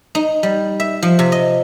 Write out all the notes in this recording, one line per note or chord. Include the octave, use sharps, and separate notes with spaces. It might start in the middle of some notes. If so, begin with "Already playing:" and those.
D#4
G3
E5
F3
C3
D#5